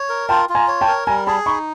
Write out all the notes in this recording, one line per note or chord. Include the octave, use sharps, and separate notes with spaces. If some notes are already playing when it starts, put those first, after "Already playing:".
Already playing: C#5
A#4
F4 G5 A5
F4
G#5 A#5
C#5
G5 A5
A#4
G3 G#5 A#5
G#4 A5 B5
D#4 B5 C#6